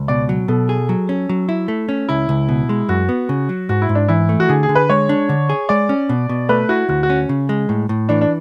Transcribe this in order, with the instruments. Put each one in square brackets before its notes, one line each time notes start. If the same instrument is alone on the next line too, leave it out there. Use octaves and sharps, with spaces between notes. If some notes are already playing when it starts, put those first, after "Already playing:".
Already playing: [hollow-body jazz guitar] C#2
[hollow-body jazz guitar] B2 [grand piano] D5
[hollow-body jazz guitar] F#3
[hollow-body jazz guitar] B2 [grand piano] A4
[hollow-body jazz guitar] G#4
F#3
C#4
F#3
E4
A3
C#4
[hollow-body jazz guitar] C#2 [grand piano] E4
[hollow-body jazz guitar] C#2
B2
G#3
[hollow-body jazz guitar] F#2 [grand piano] F#4
[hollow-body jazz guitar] B3
C#3
F#3
[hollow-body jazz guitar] G#2 [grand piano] F#4
[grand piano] E4
[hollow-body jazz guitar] G#2
[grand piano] D4
[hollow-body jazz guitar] E3 [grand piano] E4
[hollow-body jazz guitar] A3
[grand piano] F#4
[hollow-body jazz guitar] D3 [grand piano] G#4
[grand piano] G#4
[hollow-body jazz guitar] D3
[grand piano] B4
[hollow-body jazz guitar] G#3 [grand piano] C#5
[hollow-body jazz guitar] D4
D3
G#4
[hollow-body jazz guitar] G#3 [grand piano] D5
[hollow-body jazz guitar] C#4
B2
B2
[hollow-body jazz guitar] A3 [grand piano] B4
[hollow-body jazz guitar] E4 [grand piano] F#4
[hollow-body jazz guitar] D2 [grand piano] F#4
[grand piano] F#4
[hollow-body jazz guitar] C#4
C#3
G#3
A2
A2
[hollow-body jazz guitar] E3 [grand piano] D4
[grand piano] D4